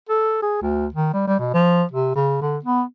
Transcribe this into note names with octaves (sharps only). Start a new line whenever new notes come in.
A4
G#4
D2
D#3
G3
G3
B2
F3
C3
C#3
D3
B3